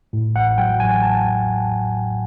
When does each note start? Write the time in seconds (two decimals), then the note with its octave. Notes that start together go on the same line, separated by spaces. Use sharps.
0.13 A2
0.35 A1 F#5
0.58 F#3 G5
0.80 A1 G#5
1.03 A1 A5